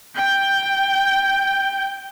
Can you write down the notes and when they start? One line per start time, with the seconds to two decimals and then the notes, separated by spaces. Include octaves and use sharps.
0.15 G5 G6